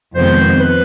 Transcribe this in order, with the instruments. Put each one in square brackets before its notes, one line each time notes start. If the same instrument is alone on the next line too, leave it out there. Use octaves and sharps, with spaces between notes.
[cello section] F2 C3 D#3 G#3 B3 [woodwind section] C5
[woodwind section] B4